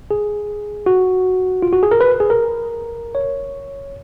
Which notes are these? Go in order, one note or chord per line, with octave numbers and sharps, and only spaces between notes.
G#4
F#4
F4
F#4
G#4
A#4
B4
G#4
A#4
C#5